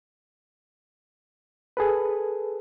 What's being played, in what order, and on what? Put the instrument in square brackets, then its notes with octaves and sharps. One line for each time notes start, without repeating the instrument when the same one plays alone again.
[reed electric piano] G#4 A4 B4